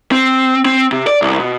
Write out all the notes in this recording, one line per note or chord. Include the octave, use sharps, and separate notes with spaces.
C4
C4
C3
D5
C2
B2